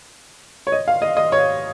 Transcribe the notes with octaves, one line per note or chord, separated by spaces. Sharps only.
C#5
D#5
F5
D#5
D#5
C#5